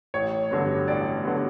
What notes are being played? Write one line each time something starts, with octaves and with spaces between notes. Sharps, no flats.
A1 C#5
G2 D3 F#3 B3
A1 D5
D3 F#3 B3